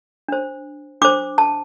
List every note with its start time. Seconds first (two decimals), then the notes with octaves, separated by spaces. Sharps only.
0.28 D4 C5
1.01 D4 C5 D6
1.38 A5